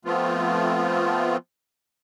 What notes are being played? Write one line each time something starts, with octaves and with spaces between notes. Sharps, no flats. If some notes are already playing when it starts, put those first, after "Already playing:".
F3 A3 B3 C4 F4